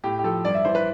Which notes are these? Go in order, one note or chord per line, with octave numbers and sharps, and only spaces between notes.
A2 G4
G4
F3 A4
G2 D5
E5
E3 C5
B4